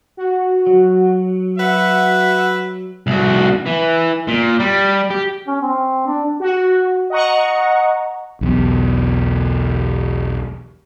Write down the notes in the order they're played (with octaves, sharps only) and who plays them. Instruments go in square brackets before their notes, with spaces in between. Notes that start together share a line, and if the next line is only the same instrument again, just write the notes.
[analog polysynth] F#4
[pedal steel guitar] F#3
[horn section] F#4 B4 E5 [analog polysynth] F#5
[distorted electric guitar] C2 F#4
E3
A#2
G3
G4
[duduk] C#4
C4
D4
[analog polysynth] F#4
D#5 F#5 A#5 C#6
[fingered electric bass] B1 E2